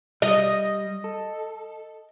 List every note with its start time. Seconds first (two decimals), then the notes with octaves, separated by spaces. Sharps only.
0.22 G3 D#5
1.04 A4